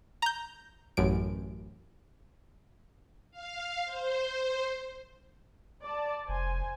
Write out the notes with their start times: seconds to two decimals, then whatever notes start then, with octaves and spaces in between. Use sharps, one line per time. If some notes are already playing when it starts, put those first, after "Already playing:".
0.22 A#5 G6
0.97 A1 F#2 D7
3.31 F5
3.84 C5
5.82 D5 A5
6.29 F1 C5 G#5